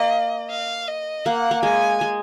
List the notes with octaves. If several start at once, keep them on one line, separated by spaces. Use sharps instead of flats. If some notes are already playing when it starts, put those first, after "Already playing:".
Already playing: A#3 D#5
F5
D#5
A#3 F#5
A#3
G#3 G#5
G#3